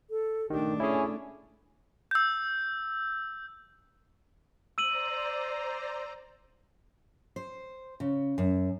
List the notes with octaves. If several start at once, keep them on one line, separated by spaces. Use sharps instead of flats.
A4
D#3 A3 D4 G4
C#4 E4 G#4 A4
E6 G6
C5 D5 A#5 E6 D#7 F#7
C5
C#3
F#2